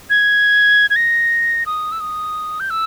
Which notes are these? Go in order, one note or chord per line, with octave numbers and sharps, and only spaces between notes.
G#6
G#6
A#6
D#6
E6
D#6
G6
E6